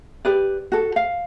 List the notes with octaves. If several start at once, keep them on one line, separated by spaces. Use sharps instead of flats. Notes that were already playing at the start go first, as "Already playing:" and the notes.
G4 B4 D5
F#4 A4
F5